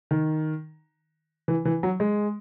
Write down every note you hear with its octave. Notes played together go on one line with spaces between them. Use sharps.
D#3
E3
E3
F#3
G#3